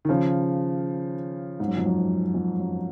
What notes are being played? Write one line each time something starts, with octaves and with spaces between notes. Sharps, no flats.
D#3
C#3 F3
G#2
F#2
F2
F#2
F2
F#2